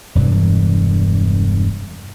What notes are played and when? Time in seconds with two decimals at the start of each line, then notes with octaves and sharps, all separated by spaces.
0.15 E1 G2 C3 E3